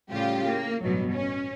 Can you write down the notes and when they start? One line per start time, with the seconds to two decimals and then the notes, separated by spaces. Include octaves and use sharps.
0.10 A2 C#3 G3 F4 G4
0.45 A#3
0.82 A1 G2 B2 F#3
1.14 C#4